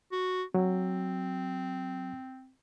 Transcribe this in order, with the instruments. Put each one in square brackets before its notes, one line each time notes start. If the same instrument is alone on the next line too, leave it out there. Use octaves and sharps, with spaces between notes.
[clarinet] F#4
[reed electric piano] F#3 [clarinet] C4